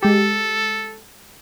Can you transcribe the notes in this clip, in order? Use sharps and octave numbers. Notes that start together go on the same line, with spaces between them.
G#3 G4 A4